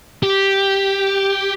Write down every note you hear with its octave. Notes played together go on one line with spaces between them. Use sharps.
G4